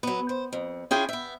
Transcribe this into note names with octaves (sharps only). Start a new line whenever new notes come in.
F#3 B3
C5
F2
C#4 E4 F4 G#4 G5 G#5
B3 E5